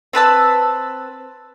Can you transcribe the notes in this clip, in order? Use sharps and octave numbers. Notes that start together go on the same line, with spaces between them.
C4 B4 A5 E6